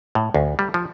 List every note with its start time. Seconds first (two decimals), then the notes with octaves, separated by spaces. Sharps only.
0.15 A2
0.34 D2
0.59 G3
0.74 F3